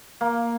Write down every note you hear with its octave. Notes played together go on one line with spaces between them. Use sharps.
A#3